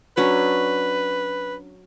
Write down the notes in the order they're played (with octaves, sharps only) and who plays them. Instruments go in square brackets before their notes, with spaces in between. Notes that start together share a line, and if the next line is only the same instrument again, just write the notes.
[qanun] F#3 C#4 D4 [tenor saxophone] B4